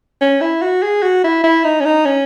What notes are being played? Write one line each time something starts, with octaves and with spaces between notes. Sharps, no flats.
C#4
E4
F#4
G#4
F#4
E4
E4
D#4
C#4
D#4
C#4